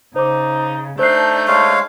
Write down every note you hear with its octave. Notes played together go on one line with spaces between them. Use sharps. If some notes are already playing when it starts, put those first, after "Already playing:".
C#3 D#4 C5 D6
A3 D4 D#4 C5 F#6 G6 C7
G#3 C#5 F5